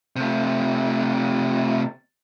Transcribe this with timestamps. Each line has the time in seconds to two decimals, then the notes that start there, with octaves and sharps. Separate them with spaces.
0.16 C3 A3